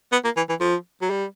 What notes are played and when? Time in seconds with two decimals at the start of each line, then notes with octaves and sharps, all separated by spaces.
0.12 B3
0.25 A#3
0.37 E3
0.49 E3
0.61 F3
1.02 F#3
1.10 G3